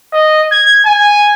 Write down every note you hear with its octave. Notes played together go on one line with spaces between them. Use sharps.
D#5
G#6
G#5